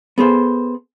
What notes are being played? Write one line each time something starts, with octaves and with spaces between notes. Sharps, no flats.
B3 G#4 A4 C5